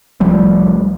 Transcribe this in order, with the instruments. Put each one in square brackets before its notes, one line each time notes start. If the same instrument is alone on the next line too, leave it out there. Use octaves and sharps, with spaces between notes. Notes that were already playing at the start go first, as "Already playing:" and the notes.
[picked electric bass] C2 F3 G3 A3